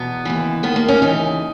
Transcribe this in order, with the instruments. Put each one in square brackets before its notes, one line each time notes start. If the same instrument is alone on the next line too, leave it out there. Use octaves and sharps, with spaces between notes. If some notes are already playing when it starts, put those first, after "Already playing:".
Already playing: [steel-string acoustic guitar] E2 B2 B3
D#2 C#3 E3
D#2 D#3 B3
A#3
C#4
D#2 C#3 E3 D#4